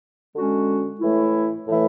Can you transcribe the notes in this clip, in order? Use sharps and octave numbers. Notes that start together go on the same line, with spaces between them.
D3 G#3 C#4 F#4
A2 E3 A3 E4
A2 E3 A3 E4